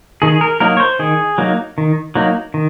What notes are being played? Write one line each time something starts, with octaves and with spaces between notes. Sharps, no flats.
D#3 G#4
A#4
F#3 A#3 D#4 A#4
C#5
C5
D#3 G#4
F#3 A#3 D#4
D#3
F#3 A#3 D#4
D#3